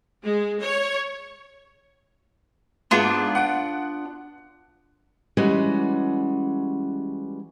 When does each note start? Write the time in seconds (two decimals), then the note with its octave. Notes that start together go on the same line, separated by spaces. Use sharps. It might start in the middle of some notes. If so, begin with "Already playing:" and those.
0.25 G#3
0.62 C#5
2.91 G#2 B3 D4 F4
3.35 F#5 D7
5.37 E3 G3 G#3 C#4 F#4